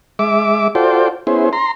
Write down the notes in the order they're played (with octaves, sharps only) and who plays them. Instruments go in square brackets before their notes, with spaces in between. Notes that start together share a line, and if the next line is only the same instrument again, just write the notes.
[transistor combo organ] G#3 E5 D6
F4 F#4 A4 C5 D5 G5
B3 C#4 E4 G#4 C5
A#5 C6